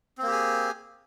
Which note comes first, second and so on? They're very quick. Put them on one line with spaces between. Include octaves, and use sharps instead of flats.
C4 A#3 G4 G#4